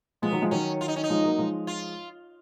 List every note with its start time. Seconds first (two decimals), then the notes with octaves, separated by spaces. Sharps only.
0.22 F3 G#3 B3
0.32 D#3 F#3
0.42 F3 G#3
0.51 D#3 F#3 C#4
0.81 F4
0.88 D#4
0.96 C#4
1.04 D#4
1.10 F3 G#3
1.24 F#3 A#3
1.38 F3 G#3
1.67 F4